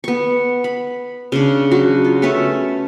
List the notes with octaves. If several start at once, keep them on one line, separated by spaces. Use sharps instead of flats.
B3 C#6
B5
C#3 D4
F#3 F#4
F4
A3 B3 C#4 E5